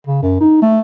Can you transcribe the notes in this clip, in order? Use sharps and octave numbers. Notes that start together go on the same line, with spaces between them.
C#3
F#2
D#4
A3